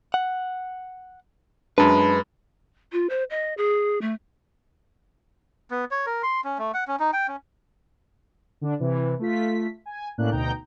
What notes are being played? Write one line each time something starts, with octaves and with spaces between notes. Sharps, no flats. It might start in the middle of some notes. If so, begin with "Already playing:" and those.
F#5
F#2 G#3 D4 B4 A5 B5
F4
C5
D#5
G#4
A3
B3
C#5
A#4
C6
C#4
A3
F#5
C#4
D#4
G5
C#4
D3 D4
C3 E3
A3 F4 B6
G#5
A2 A#3 C#4 D4 F#6
D2 B2 D#4 G5 A#5 G6